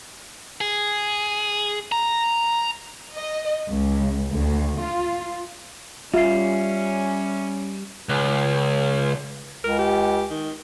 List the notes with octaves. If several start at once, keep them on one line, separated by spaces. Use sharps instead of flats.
G#4
A#5
D#5
C#2
D2
F4
G3 C#4 F4 E5 C7
C#2
C#2 A#4
G4
D#3